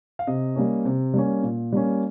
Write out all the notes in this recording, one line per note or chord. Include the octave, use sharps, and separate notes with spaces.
F5
C3 D#5
G3 A#3 C#4
C3
G3 A#3 C#4
A#2
G3 A#3 C#4